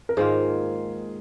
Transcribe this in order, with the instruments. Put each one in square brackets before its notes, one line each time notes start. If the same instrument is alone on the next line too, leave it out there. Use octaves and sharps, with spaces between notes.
[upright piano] A#4
[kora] G#2 D#3 A#3 F4 [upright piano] G#4